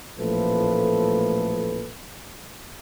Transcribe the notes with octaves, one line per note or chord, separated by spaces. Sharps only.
A1 A#2 F3 A3 A4 B4